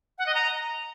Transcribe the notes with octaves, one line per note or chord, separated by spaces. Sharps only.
F#5
D#5
A#5